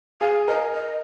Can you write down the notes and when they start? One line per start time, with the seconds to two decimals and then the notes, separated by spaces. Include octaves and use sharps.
0.21 G#4 F5
0.48 A#4 D#5
0.75 D#5